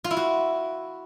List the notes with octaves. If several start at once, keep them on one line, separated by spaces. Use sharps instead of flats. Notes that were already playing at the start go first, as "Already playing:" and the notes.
F4
E4
F#4